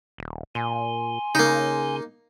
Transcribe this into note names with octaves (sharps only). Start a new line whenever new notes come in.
D#1
A#2 G#5 C6
C#3 A#3 D#4